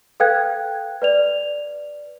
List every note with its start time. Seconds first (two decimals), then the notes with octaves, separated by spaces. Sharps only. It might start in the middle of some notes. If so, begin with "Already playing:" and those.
0.20 A4 B4 F5 G5 F#6 G#6
1.02 B4 D5 F7